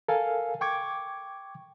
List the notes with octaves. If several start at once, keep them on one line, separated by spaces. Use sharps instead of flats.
A4 A#4 F5 G#5
G5 C#6 D6 G#6